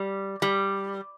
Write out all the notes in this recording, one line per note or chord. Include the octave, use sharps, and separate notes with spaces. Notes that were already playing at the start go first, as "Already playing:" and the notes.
Already playing: G3
G3